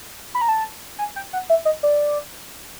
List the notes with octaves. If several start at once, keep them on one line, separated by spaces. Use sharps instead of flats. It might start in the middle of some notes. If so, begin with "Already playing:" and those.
B5
A#5
A5
G#5
G5
F#5
E5
D#5
D5